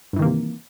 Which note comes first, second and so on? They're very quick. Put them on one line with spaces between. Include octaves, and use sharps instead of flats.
G2 E3 D#3 A#3 C3